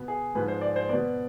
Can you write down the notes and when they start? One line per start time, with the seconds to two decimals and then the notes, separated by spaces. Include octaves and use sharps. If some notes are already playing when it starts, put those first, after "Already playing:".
Already playing: B2 B3
0.08 G#4
0.35 G#2 F3 G#3 B4
0.48 C5
0.61 D5
0.76 C5
0.89 B3 D5
0.93 B2